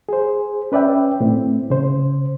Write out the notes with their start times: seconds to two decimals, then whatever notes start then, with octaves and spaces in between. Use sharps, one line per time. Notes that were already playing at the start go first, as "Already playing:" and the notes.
0.09 G#4 C5
0.72 C#4 B4 D5 E5 G5
1.20 A2 C4
1.70 C#3 C5